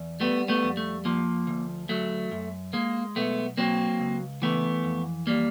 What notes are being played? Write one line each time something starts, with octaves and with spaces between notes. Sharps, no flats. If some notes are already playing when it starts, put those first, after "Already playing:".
Already playing: E2
G3 A3 B3
A3 B3
F2
A3
F3 A#3
D2
F#3 A3
F#2
G#3 A#3
B1 A3 B3
F#3 A#3 C4
C#2
E3 A3 B3
F2
G3 A#3